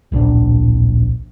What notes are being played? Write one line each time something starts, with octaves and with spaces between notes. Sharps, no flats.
D1 A#1 C4 D4